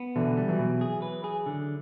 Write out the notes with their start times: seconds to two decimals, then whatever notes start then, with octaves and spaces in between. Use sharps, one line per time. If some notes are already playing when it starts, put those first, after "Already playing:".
Already playing: B3
0.16 B2 D3 E3
0.37 G3
0.48 E3 F#3
0.59 B2
0.81 G#4
1.02 B4
1.24 G#4
1.46 D3